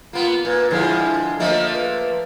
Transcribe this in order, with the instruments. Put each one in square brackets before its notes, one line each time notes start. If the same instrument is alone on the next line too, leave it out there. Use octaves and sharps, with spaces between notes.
[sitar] A#3 B3 [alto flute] F4
[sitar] A#2 [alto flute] B4
[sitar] D3 F3 G#3 [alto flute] E4
[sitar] F3 A3 A#3 [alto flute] D#5
[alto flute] B4